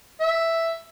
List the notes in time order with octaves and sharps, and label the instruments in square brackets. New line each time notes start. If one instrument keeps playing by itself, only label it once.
[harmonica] E5